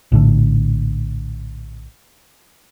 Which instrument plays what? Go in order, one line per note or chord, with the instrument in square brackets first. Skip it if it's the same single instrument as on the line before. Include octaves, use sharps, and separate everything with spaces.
[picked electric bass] A#1 A2 D3